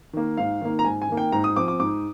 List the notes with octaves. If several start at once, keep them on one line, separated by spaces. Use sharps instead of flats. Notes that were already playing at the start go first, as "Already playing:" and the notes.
D#3 A#3
G#2 F5
D#3 A#3
A#5
G#2 G#5
G#5
D#3 A#3
G5
G#2 A#5
D#6
F3 C4 D6
D6
G#2 D6